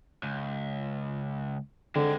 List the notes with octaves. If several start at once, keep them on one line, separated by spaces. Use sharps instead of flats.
C#2
D3 G#3 C4